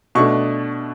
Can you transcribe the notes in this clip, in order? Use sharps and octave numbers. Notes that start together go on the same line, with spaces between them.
B2 A3 D4 C#6